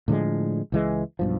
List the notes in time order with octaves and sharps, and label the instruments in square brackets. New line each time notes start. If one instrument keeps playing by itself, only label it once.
[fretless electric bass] A2 D3 F3 G#3
C#2 E3 G#3
B1 G2 F3